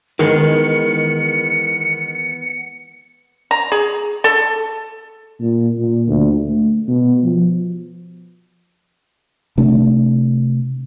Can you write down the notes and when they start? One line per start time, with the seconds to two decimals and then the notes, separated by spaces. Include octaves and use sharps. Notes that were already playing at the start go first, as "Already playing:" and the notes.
0.19 D#3 E3 G#3 B3 C#7
3.51 A#5
3.72 G#4
4.24 A4
5.40 A#2
5.78 A#2
6.08 D2
6.48 A3
6.88 B2
7.23 F3
9.58 C3 A3 D4